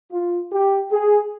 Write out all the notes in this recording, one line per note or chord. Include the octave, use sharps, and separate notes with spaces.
F4
G4
G#4